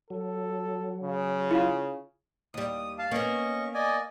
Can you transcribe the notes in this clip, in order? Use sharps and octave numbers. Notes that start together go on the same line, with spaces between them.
F#3 A4
C#3
E4 F4 F5
D#2 G3 D#6
F5 A5
A#3 B3 C#4 D#5 C#6
D5 D#5 G#5